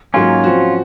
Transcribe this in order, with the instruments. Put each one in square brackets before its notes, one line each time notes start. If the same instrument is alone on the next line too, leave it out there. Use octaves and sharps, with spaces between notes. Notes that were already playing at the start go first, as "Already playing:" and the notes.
[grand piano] G#2 F#3 A#3 [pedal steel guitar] C#4 F4
[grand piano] F3 C4 F#4